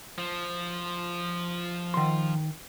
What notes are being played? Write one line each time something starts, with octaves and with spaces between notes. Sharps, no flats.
F3
D#3 C6